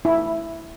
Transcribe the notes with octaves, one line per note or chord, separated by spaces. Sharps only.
E4